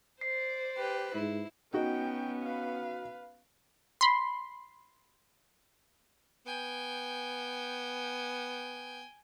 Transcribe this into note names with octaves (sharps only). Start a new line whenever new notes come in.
C5 D5 C7
G4 B4
G#2 E4
B3 C#4 D#4 F#4 G5
B4 F5
B5 C6
B3 G5 G#5